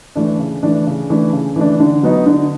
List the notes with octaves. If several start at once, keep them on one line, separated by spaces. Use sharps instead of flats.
E3 A3 D4
C#3
E3 A3 D4
C#3
E3 A3 D4
C#3
E3 A3 D4
D3
F#3 B3 D#4
D3